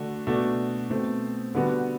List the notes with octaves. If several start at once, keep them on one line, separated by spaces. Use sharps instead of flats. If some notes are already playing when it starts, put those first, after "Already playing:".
Already playing: D3 A3 D4 F#4
B2 A3 D4 F#4
B2 A3 C4
D3 G3 B3 F#4